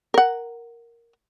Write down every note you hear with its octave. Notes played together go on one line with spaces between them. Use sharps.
A#4 F#5